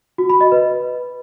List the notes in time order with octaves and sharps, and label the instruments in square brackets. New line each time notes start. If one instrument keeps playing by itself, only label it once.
[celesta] F#4
B5
D#5
B4